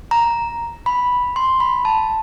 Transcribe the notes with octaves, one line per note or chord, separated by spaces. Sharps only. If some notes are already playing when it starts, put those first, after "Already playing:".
A#5
B5
C6
B5
A5